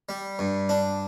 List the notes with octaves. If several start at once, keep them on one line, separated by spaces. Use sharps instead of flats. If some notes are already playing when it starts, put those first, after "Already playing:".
G3
G2
D4